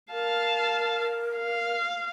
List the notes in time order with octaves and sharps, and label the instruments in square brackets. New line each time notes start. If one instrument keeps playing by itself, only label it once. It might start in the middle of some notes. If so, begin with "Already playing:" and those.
[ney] A#4 [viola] F5 A5
[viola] F5